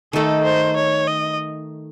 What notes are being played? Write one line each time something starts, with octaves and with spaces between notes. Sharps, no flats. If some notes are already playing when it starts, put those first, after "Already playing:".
D#3 A3 D#4 A4
C5
C#5
D#5